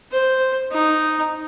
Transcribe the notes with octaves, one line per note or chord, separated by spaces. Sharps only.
C5
D#4